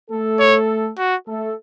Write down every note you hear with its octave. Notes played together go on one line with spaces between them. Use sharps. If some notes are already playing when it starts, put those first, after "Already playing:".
A3 A4
C#5
F#4
A3 A4